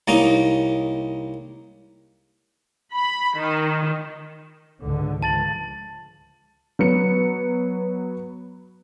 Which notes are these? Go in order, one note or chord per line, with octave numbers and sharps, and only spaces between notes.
C2 A#3 C#4 D#4 D#5
B5
D#3
C#2 G#2 D3
C#2 F3 A5 A6 F#7
F#3 B3 C#7